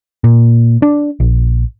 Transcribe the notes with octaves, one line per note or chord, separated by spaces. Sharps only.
A#2
D4
A#1